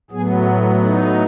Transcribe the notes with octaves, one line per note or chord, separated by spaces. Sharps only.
A2 F#3 B3 G#4
D#4